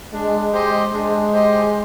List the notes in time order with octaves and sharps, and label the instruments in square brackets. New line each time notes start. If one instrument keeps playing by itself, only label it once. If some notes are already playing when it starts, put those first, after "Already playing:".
[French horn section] G#3 [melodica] D4
[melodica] G4 C5 D#5
[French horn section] G#3 [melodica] D4
[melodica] G4 C5 D#5